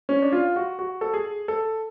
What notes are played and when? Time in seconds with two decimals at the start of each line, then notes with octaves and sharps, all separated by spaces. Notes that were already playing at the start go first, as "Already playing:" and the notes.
0.09 C#4
0.22 D4
0.32 F4
0.56 F#4
0.79 F#4
1.01 A4
1.14 G#4
1.48 A4